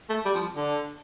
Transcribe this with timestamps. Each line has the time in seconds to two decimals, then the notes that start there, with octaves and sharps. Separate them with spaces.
0.09 A3
0.25 G3
0.35 F3
0.56 D3